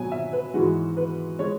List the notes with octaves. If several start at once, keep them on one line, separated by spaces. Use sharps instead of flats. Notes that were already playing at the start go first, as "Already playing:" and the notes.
Already playing: B2 F#3 G#5
E5
B4
G#2 E3 G#3 F#4
B4
G#3 C#5